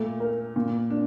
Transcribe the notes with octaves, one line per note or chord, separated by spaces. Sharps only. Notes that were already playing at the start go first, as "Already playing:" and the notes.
Already playing: A#2 A3
A#4
A#2
D4